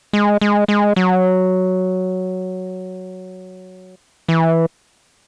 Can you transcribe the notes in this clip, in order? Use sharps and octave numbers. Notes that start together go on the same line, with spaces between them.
G#3
G#3
G#3
F#3
E3